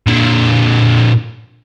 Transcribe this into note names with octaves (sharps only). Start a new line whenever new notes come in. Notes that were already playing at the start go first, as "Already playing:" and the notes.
A#2 D3